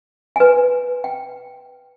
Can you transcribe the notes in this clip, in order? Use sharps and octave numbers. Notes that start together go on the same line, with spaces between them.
B4 G#5
G5